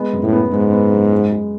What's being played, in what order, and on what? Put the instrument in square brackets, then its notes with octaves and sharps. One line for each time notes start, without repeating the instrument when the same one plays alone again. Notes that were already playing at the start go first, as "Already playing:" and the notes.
Already playing: [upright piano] G#3 B3
F#2
[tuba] A2
[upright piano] B3
[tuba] G#2 [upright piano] B3
[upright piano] B3
F#2
G#3
G#3